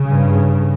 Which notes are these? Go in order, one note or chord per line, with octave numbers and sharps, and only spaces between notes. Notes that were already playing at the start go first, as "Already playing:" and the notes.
Already playing: C#3
G2